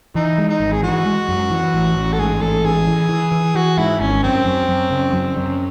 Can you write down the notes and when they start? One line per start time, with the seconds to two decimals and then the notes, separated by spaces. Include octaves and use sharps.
0.15 E3 D#4
0.38 G#3
0.49 D#4
0.60 G#1
0.72 G#4
0.83 E3 F#4
1.05 G#3
1.29 F#2
1.51 E3
1.74 A1
1.96 A1
2.13 A4
2.19 G#2 G#4
2.41 A1 A4
2.64 E3 G#4
2.87 E3
3.09 E3
3.32 E3
3.55 E3 F#4
3.78 G#2 E4
4.00 G#1 C#4
4.23 F#2 C4
4.45 F#2
4.68 F#2
4.90 C#3
5.13 F#2
5.37 F#2